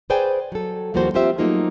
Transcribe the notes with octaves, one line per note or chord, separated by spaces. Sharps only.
G#4 B4 C5 D5 G5 G#5
F#3 A4
D#2 F3 G3 A#3 F#4 C5
F3 C4 F4 G4 C5 E5
F#3 A3 A#3 D#4 F4 G#4